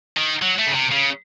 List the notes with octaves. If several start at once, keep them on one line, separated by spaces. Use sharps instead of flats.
D#3
F#3
A3
C#3
C3
C#3